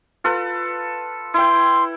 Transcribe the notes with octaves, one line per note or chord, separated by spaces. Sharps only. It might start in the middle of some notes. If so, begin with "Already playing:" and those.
F4 A4 B4
E4 G5 C6